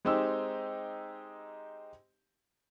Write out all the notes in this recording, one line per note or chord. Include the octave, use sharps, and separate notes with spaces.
G#3 C4 D#4 G4 E6